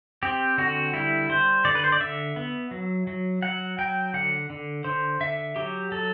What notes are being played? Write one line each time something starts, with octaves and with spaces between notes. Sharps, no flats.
C4 G4
D3 F#4
G3 E4
G3 C5
D3 D5
B4
C5
D5
D3 E5
B3
F#3
F#3
F#3 F#5
F#3 G5
D3 F#5
D3
D3 C5
D3 E5
F#3 G4
F#3 A4